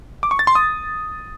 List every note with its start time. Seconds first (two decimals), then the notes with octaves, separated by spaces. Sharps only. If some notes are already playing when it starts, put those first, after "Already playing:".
0.23 D6
0.31 C#6
0.39 A6
0.47 C6
0.55 D#6